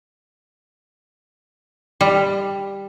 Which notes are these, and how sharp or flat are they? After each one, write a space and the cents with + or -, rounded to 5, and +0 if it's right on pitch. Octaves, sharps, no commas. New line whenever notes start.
G3 +10